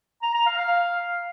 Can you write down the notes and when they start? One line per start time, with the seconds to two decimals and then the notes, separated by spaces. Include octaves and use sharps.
0.22 A#5
0.34 A#5
0.46 F5
0.58 F5